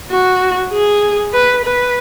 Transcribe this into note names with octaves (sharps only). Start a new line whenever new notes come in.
F#4
G#4
B4
B4